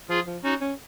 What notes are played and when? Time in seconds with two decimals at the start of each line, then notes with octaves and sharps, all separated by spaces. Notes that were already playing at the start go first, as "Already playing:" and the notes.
0.09 F3 F4 G#4
0.26 F3
0.44 C#4 D#4 F#4
0.61 C#4